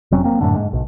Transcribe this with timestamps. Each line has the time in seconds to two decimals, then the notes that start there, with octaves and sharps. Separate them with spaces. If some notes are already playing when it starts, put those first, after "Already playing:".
0.11 F1 F#3 C4 C#4
0.24 A#3 C4
0.41 F#2 A2 D3
0.55 G#2
0.73 B1